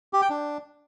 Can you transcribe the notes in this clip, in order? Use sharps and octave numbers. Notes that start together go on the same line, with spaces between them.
G4
G5
D4